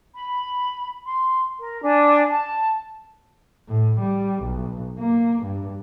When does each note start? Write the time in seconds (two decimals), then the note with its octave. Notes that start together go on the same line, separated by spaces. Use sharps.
0.14 B5
1.05 C6
1.60 A#4
1.83 D4 G#5
2.29 A5
3.69 A2
4.01 G3
4.43 B1
4.99 A#3
5.43 G2